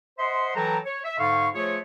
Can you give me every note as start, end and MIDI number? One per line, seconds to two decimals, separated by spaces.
0.18 0.55 72
0.18 0.55 75
0.18 0.55 76
0.18 0.55 78
0.18 0.55 84
0.55 0.78 52
0.55 0.78 54
0.55 0.78 69
0.55 0.78 79
0.55 0.78 81
0.55 0.78 82
0.86 0.99 73
1.04 1.17 76
1.19 1.49 44
1.19 1.49 50
1.19 1.49 77
1.19 1.49 85
1.54 1.77 53
1.54 1.77 57
1.54 1.77 65
1.54 1.77 68
1.54 1.77 73